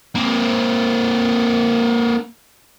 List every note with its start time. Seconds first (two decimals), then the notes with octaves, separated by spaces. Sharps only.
0.15 A#3 C4